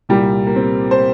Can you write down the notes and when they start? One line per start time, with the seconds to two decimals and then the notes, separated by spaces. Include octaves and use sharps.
0.09 C2 A#2 G3 A#3 G4
0.47 A#3
0.56 C4
0.91 C5